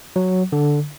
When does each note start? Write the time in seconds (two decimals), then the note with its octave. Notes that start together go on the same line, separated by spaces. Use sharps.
0.16 F#3
0.52 D3